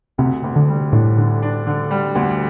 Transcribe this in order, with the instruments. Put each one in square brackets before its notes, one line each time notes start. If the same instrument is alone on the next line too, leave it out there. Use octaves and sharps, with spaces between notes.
[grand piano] D2 [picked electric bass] C3
[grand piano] D2
[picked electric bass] D3
[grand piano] G3
[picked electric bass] A2 [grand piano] D4
[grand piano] D3
D4
D3
G3
D2